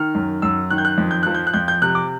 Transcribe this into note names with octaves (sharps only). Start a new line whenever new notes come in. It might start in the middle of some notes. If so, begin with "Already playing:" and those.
Already playing: D#3 F6
F#2
F#2 E6
D#3 F#6
G6
F#6
F2
G6
F3 F#6
G6
F#6
F2 G6
G6
C3 F#6
D6